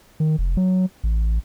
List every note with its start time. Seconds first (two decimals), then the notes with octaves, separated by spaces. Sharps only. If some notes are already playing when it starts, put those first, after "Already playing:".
0.20 D#3
0.38 F1
0.57 F#3
1.04 A1